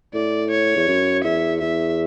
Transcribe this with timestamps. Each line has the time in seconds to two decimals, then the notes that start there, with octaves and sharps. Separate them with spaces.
0.14 A2 D5
0.51 C#5
0.76 E2
0.88 F#2
1.24 E2 E5
1.61 E2 E5